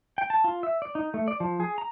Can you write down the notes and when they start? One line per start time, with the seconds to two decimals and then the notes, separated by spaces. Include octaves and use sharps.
0.18 G5
0.30 A5
0.44 F4
0.63 E5
0.82 D5
0.95 D#4
1.14 A3
1.28 D5
1.40 F3
1.60 G#4
1.78 A#5